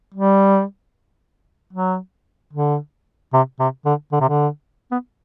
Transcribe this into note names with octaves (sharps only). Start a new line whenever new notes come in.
G3
F#3
D3
C3
C3
D3
D3
C3
D3
B3